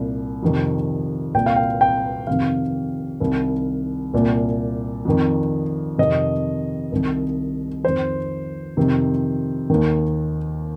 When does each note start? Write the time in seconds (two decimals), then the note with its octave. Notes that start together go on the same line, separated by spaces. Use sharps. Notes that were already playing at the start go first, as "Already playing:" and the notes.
Already playing: C2 A#2
0.43 F2 C3 D#3
1.34 C2 A#2 G5
1.46 F5
1.56 G5
1.81 G5
2.27 F2 C3 D#3 F5
3.20 C2 C3 D#3
4.14 C2 A#2
5.05 F2 D#3
5.98 F2 C3 D#3 D#5
6.92 C2 C3 D#3
7.84 F2 D#3 C5
8.77 F2 C3 D#3
9.70 D#2 D#3